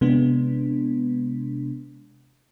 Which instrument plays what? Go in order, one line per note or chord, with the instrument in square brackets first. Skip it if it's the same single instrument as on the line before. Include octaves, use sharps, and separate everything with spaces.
[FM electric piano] C3 G#3 B3 D4